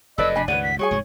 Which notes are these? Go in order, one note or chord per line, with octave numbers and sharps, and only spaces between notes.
F1 F#2 C3 A4 B4 D5 D#5 E6
D4 G#5 B5
C#2 G2 D#3 B4 C#5 D5 F#5 D#7
B6
G3 F#4 G#4 C#5 G#5 C#6
F1 G#2 G#3